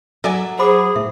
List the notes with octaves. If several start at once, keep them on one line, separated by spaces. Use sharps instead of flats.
F#3 A4 D5 E5 G#5
G#4 C5 B5 D6
A2 E5